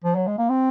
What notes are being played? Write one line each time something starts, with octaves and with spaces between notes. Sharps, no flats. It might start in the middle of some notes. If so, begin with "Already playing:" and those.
F3
F#3
G#3
A#3
C4